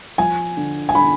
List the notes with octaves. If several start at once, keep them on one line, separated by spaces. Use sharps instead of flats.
F3 G#5
D3
G#5
D3 B5